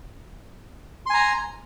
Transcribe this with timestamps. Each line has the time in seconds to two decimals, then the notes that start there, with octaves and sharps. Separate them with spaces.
1.06 C6
1.10 G#5
1.14 A#5